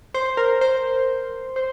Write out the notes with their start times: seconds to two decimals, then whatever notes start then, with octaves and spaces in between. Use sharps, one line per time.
0.14 C5
0.37 A#4
0.61 C5
1.56 C5